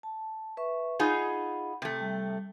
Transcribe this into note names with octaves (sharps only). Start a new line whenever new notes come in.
A5
B4 E5 C#6
D#4 F4 G#4 F#5 B5
C3 A3
G3